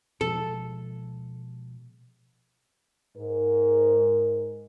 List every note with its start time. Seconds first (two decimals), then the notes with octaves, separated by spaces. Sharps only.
0.21 B2 F3 G#3 A4
3.17 G#2 A#4